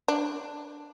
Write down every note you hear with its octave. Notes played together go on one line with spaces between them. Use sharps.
D4